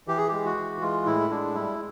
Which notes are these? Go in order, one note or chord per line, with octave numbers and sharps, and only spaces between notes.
E3 G4
G#4
G#3 G4
F#4
E3
G#3 F4
A2 E4
G#3 D4
G3 E4